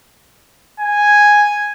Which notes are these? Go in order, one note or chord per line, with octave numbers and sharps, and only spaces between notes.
G#5